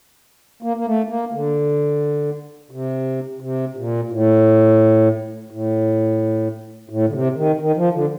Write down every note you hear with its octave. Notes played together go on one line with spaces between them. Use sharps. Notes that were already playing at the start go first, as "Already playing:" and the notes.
A#3
A#3
A3
A#3
D3
C3
C3
A#2
A2
A2
A2
D3
C3
D#3
D#3
F3
D3